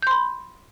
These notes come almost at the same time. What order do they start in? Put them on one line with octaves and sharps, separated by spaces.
G6 C6 B5